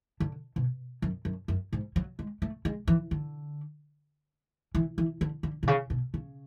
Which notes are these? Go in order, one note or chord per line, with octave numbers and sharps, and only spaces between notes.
D3
B2
F#2
F#2
F#2
G#2
F#3
G#3
A3
G#3
E3
D3
E3
E3
D3
D3
B2
C#3
B2
C#3